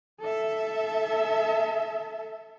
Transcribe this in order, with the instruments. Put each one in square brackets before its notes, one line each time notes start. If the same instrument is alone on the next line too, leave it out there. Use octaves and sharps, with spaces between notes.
[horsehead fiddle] A4 E5